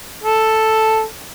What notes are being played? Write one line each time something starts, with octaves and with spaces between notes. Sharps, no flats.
A4